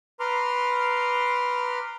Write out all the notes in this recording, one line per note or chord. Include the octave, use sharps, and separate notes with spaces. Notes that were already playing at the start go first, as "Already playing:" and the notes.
B4 A#5 C6 D6 F6